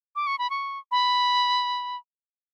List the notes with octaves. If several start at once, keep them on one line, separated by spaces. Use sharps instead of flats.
D6
C#6
B5
C#6
B5